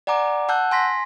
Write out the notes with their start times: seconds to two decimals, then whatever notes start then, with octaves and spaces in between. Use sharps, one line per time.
0.07 D5 F#5 G#5 A#5 D6
0.49 F#5 A5 E6 F#6 G6
0.71 G#5 C6 A#6 B6